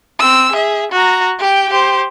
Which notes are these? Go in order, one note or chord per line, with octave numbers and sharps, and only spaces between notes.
C4 E6
G#4 E5
F#4 A#5
G4 G5
G4 C5